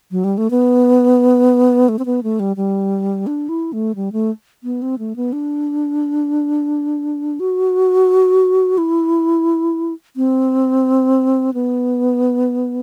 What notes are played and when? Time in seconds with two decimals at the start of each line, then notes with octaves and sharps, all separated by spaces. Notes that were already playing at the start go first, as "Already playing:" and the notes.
0.11 F#3
0.24 G3
0.38 A3
0.51 B3
1.89 A3
1.99 C4
2.06 B3
2.23 A3
2.40 G3
2.56 G3
3.27 D4
3.49 E4
3.73 A3
3.96 G3
4.12 A3
4.64 B3
4.82 C4
4.99 A3
5.16 B3
5.33 D4
7.40 F#4
8.78 E4
10.16 C4
11.54 B3